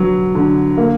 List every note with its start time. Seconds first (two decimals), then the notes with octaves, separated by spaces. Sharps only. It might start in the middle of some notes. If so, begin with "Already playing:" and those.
Already playing: D3 F#3 B3
0.35 D3
0.77 A#3